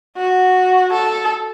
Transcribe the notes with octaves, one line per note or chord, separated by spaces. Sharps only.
F#4
A4